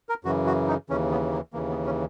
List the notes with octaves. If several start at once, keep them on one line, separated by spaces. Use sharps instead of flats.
A#4
F#2 C#3 E3 F#4
F#4
D#4
D#2 C#3 E3 C#4
B3
A#3
D#2 C#3 E3 A#3
B3
C#4